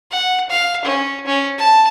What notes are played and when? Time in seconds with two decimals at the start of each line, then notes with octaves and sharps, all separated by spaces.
0.11 F#5
0.49 F5
0.85 C#4
1.26 C#4
1.58 A5